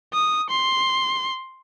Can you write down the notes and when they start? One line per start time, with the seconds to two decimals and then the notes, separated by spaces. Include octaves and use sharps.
0.13 D#6
0.50 C6